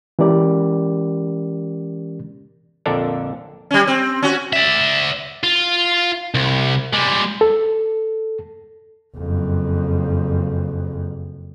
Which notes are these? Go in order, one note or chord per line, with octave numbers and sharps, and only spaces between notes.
E3 G#3 C#4 G4 A#4 D5
A#1 F2 D3 D4 A4 A#4
G3 C#4
C4
C#4 F#4
D5 E5
F4
C2
G3 G#3
A4
F#1 F2